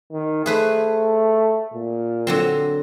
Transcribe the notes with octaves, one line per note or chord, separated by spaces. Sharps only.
D#3
A3 G#4 B4 C5
A#2
D3 F#3 C4